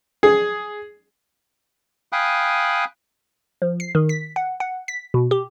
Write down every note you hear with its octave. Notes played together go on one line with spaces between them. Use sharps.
G#4
F5 G5 G#5 B5 D#6 F#6
F3
C7
D#3
B6
F#5
F#5
B6
B2
G4